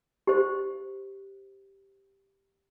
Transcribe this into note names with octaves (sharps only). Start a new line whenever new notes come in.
G4 C5